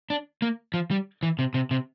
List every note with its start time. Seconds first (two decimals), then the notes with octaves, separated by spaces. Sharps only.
0.10 D4
0.42 A#3
0.74 F3
0.91 G3
1.23 E3
1.39 C3
1.54 C3
1.71 C3